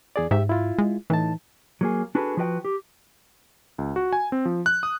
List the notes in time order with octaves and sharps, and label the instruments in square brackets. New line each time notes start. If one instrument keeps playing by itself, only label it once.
[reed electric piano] E2 G#4 D5
[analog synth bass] G#2 [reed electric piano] G4 E5
[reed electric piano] E4 F4
[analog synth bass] G#3
[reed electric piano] A2 D#4 A5 [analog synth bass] E3
[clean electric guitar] F#3 A#3 G#4
D4 F#4 G#4 A4 B4
F3 F4 F#4 B4 D#5 G5
G4
[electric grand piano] C#2
F#4
G#5
C4
F3
F#6
D#6